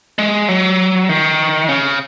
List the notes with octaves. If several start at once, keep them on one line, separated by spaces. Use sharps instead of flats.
G#3
F#3
D#3
C#3